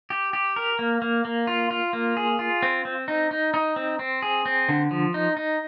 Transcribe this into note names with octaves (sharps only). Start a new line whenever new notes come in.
G4
G4
A#4
A#3
A#3
A#3
F4
F4
A#3
G#4
F4
C4
C4
D#4
D#4
D#4
C4
C4
G#4
C4
D3
F3
D#4
D#4